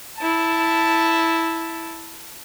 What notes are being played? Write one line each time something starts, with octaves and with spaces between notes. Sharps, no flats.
E4 A5